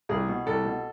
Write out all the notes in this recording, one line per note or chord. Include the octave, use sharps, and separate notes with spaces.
C2 G#4
B2
C2 A4
B2